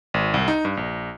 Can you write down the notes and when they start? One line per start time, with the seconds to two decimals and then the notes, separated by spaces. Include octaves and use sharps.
0.14 G#1
0.34 C2
0.48 D#4
0.65 G2
0.77 A#1